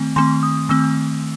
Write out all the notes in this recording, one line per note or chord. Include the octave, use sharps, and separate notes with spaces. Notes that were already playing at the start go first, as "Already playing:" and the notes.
Already playing: D#3 A3 C4
D#3 A3 C4 C6
D#6
D#3 A3 C4 E6